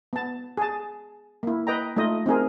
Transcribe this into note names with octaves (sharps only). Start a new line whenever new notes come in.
B3 A5
G#4 A5
A#3 E4
B4 D#5 G5 A#5
A3 D#4 F4 D#5
C4 D#4 G#4 A#4